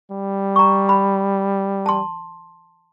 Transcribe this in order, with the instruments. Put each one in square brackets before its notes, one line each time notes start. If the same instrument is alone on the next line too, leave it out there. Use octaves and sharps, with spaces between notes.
[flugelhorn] G3
[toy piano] A#5 C#6
B5
A5 C6